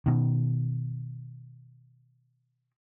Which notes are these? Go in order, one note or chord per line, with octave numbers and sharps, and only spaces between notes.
B2 D#3